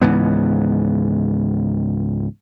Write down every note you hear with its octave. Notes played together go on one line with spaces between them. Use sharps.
C#2 G#2 E3 B3